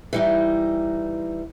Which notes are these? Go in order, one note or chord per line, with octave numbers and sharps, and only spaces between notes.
E3 G3 D#4